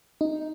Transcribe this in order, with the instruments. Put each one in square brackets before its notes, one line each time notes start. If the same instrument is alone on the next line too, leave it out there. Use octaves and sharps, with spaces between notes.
[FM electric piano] D#4